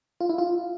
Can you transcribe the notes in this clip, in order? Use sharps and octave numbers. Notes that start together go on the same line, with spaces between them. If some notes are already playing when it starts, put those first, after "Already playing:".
F4
E4
F4